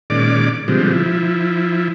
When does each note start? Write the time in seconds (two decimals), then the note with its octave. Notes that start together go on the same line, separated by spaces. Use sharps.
0.10 A#2 D#3 G#3 C#4 D5 D6
0.68 B2 D3 F3 G3 G#3 C4
0.93 F3 E4